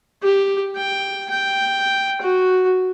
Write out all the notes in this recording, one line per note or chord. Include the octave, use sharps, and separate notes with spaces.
G4
G5
G5
F#4